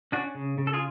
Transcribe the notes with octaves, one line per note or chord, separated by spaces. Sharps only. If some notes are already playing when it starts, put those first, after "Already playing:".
C#4 D4 F#4
C#3
C#3
A4
F4 G#4